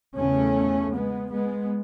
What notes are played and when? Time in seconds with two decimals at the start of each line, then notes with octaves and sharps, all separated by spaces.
0.15 E2 C#3 A3 C#4
0.93 G#3 B3
1.32 G#3 B3